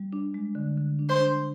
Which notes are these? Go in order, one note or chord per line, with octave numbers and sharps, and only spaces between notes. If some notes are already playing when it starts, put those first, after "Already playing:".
Already playing: G3
D4
G#3
D3
D3
D4
C5
D4